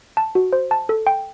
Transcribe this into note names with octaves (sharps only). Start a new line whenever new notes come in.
A5
F#4
C5
A5
A4
G5